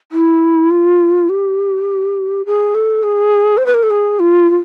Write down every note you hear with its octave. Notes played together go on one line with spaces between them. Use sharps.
E4
F4
G4
G#4
A4
G#4
C5
B4
A#4
A4
G#4
F4
F4